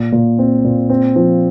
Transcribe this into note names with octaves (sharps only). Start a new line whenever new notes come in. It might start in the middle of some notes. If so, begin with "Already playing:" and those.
Already playing: A#2
A#2
C4
A#2
C4
F3